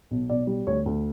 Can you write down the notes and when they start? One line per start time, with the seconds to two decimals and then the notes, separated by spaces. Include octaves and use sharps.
0.11 B1
0.30 B1 D5
0.47 G3
0.67 D2 C#5
0.86 D2